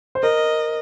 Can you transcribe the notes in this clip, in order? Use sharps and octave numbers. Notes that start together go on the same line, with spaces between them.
C5
A#4 D#5